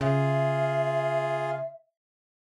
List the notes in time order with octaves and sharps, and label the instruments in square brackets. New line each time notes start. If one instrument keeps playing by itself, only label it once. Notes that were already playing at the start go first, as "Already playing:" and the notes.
[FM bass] C#3 [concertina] F4 G#4 [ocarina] E5